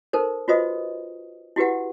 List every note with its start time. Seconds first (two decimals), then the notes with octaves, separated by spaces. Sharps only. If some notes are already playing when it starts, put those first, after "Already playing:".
0.13 D#4 A4 A#4 C5
0.48 F4 F#4 B4 C5 D#5 D#6
1.56 E4 F#4 G4 B4 F#5